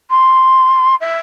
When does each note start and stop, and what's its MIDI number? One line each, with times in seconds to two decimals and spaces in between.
0.10 0.95 84
1.01 1.19 76